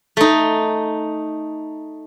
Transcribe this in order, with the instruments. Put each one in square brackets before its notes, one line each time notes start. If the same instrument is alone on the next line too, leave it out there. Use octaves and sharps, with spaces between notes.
[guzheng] A3 D#4